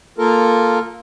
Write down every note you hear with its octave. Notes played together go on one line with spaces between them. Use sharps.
A#3 F4 A4 A#4